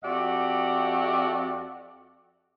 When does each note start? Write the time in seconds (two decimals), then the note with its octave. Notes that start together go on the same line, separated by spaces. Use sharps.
0.03 F2 F#4 G4 D5 E5 F#5